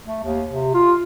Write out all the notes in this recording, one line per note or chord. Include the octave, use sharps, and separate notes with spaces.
A3
D#2
C3
F4